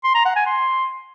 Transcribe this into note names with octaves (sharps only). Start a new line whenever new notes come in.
C6
A#5
F#5
G#5
C6